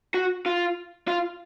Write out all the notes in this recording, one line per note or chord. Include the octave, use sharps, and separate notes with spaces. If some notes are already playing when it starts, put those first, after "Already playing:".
F#4
F4
F4